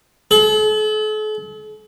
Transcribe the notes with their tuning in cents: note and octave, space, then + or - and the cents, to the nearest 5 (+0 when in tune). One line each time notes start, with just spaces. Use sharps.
A4 -45